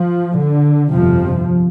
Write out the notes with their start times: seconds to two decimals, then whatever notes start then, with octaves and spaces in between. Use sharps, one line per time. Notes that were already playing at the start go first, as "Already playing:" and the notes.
Already playing: F3
0.39 D3
0.91 G1 F2 C3 F3